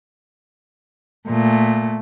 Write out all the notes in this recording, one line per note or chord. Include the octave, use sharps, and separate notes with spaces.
A#2 A3